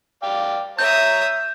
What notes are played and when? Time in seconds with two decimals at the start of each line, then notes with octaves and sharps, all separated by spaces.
0.23 D5 F5 G5
0.79 C#5 E5 A#5 D#6 G6